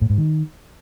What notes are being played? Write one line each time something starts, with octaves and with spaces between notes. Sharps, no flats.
A2
G#2
D#3